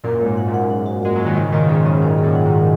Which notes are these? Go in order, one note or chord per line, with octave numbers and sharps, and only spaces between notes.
F#2 A#2 A#4
G#2 G#3
F#5
F#2 A#2
F#5
F#5
F#4
G#3 F#4
F#3 G#3
D#3
G#2 C#3 D#5
A#2 D#3 D#5
G#2 C#3 G#4
F#2 A#2 D#5
G#2 C#4
G#4
F#2
F#5
G#2
D#5